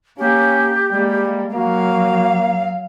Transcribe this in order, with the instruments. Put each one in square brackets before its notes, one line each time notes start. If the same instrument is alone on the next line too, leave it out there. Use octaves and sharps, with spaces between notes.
[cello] A#3 [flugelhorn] C#4 [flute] G4
[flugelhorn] G3 [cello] G#3 A#3
[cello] F#3 F5 [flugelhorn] A#3 [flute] F#4